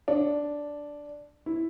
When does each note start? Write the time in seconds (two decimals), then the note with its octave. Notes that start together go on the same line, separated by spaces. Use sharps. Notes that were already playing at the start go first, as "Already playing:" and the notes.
0.08 D4
1.46 E4